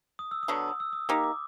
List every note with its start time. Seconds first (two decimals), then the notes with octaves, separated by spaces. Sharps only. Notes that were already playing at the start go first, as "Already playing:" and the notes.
0.19 D#6
0.31 E6
0.43 D#6
0.48 D3 F#3 B3
0.56 E6
0.68 D#6
0.80 E6
0.93 D#6
1.09 A#3 D#4 G4 D6
1.24 D6